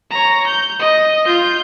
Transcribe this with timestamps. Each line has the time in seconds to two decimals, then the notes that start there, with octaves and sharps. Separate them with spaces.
0.10 C#5 A#5
0.47 G6
0.79 D#5
1.26 F4 G6